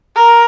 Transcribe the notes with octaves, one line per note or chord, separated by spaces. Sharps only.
A#4